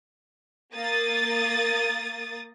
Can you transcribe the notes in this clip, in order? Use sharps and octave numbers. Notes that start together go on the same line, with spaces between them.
A#3 D#6 A6